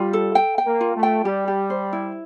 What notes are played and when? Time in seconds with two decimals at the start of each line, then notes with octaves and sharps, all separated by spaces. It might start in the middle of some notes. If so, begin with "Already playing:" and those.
Already playing: G3 F4
0.13 A4
0.35 G5
0.58 G5
0.66 A#3
0.81 F4
0.96 A3
1.03 G5
1.25 G3 G4
1.48 G4
1.70 C5
1.93 E4